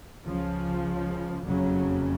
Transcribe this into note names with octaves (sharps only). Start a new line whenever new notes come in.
C#2 C#3 F3
F#1 F2 C#3 F#3